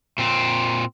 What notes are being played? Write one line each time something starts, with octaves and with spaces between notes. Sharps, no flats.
A#2 C4